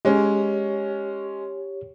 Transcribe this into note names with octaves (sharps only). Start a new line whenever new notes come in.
G#3 C#4 G4 C#5